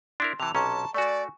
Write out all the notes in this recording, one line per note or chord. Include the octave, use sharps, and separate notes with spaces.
D4 E4 A#4 C6
C3 E3 A5 F7
B1 C3 C#4 A5 A#5 C6 C#6
A3 F#4 D5 G#5 C#6